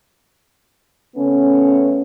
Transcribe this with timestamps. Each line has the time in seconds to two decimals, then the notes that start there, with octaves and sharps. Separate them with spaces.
1.16 C#3 A3 B3 C#4